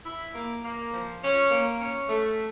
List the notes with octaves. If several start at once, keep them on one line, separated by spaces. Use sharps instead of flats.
E4
A#3
A#3
F3
C#4
A#3
C#4
A3